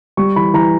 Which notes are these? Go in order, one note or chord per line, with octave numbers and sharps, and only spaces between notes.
G3 C#6
E3 B5
E3 A#5